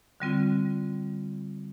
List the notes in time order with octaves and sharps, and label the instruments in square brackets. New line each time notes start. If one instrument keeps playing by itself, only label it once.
[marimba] D3 G3 C4 F4